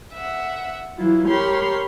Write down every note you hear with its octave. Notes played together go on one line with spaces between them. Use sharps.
E5 F#5
E3 F#3 E4 F4
G4 A#4 C#5 B5 C6 F6